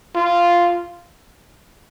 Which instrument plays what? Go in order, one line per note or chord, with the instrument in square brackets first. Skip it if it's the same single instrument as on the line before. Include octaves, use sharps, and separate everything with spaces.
[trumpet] F4